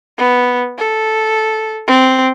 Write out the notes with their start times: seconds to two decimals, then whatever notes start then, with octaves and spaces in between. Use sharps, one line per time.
0.18 B3
0.78 A4
1.87 C4